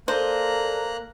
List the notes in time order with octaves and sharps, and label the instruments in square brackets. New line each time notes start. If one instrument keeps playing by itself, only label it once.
[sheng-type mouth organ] A#3 A#5 F#6 [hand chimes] A4 D5 A5 [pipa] C5